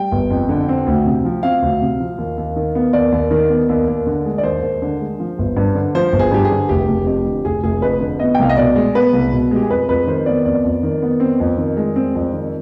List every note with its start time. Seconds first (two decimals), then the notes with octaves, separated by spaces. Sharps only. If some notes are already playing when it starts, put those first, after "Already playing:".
Already playing: G3 G5
0.12 G1
0.30 F2
0.49 D3
0.69 C4
0.87 D2
1.06 C3
1.25 F3
1.43 C4 F5
1.62 D2
1.82 C3
2.00 F3
2.18 D#2
2.38 D#2
2.56 D#3
2.75 B3
2.93 D#2 D5
3.12 D#2
3.31 D#3
3.50 B3
3.69 D#2
3.88 D#2
4.07 D3
4.25 G#3
4.38 D5
4.43 D#2 C5
4.63 D#2
4.82 D3
5.00 G#3
5.20 F3
5.39 G1
5.57 G2
5.75 D3
5.95 F3 C5
6.13 G1
6.19 G#4
6.31 G2 G4
6.45 G#4
6.51 D3
6.69 F1 G4
6.88 F1
7.07 F2 G4
7.26 D3
7.45 F1 G#4
7.63 F1 G#4
7.82 F2 B4
8.01 D3
8.20 B3 D#5
8.35 G5
8.39 C2 F5
8.49 D#5
8.57 B2 D5
8.76 G#3
8.95 B3 B4
9.13 C2
9.32 B2
9.51 G#3 G4
9.63 G#4
9.70 F2 B4
9.89 F2 B4
10.07 D#3 C5
10.26 B3 D5
10.45 F2 D5
10.65 F2
10.83 D#3
11.02 B3
11.20 C4
11.40 F2
11.58 D#3
11.77 G#3
11.96 C4
12.15 F2
12.33 D#3